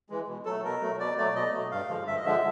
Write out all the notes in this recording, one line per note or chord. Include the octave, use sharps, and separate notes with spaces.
E3 G#3
B2
F#3 A3 A4
B2 A#4
F#3 A3
B2 D5
F#3 A3 D5
B2 D#5
F#3 A3
G2 F5
D3 F3 G#3
G2 E5
D#5
D3 F3 G#3 E5